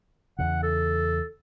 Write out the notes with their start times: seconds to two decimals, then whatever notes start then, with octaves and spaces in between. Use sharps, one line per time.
0.38 E2 C#3 F#5
0.63 A4